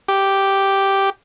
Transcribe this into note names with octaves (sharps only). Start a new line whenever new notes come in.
G4